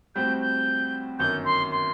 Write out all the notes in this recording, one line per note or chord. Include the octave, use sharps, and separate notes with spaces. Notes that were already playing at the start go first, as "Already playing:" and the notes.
A2 G3 C4 F#4 G6
G6
G1 F#2 D#3 G6
C6
C6